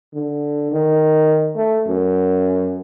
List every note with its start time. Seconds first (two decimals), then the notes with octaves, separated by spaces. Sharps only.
0.14 D3
0.72 D#3
1.56 A3
1.88 F#2